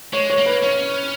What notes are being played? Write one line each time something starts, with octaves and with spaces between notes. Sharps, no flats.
G#3 C#5
C#5
A#3
B4
C#4 C#5